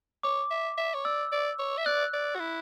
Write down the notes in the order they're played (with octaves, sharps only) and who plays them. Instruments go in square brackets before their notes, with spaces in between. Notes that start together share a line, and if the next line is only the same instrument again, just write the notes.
[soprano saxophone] C#5 [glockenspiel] D6
[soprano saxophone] E5
E5
C#5
[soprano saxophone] D5 [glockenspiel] E6
[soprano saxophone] D5
C#5
E5
[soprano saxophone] D5 [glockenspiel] F#6
[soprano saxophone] D5
F#4
E4